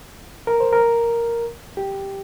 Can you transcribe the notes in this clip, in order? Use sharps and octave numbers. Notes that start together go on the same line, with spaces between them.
A#4
C5
A#4
G4